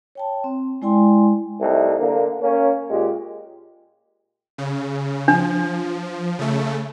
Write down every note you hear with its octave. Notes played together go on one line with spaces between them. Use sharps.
C#5 G5 A5
C4
G#3 E4 D5 G5 G#5 C6
C2 A3 D#4
D3 A#3
A#3 C#4
A#2 G#3 G4
C#3
F3 D4
C#3 A3